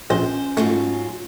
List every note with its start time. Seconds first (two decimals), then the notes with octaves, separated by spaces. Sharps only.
0.10 A#1 C#4 C5
0.57 G#2 F#3 A3 F4